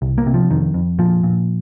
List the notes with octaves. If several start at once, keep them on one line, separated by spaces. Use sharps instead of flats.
C2
A#3
C3
F3
F2 D#3
F2
A#2 F3
A#2